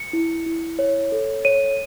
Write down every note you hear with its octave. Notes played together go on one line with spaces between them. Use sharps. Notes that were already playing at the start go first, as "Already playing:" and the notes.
Already playing: C#7
E4
E4
C#5
A4
C#5 D#7